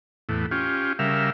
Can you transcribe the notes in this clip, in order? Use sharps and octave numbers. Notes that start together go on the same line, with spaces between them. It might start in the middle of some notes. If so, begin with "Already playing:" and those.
E2 A2
C#4 F4 G4
C#3 G3 A#4 E5 F5